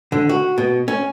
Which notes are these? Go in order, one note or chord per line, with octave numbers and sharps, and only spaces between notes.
D3
F#4
B2
C#4